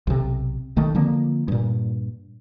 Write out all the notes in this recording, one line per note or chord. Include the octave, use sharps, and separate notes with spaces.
B1 C3
B1 D#3 A3
D3 F3 A#3 C4
G2 A#2